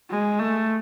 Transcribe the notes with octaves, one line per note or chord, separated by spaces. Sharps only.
G#3
A3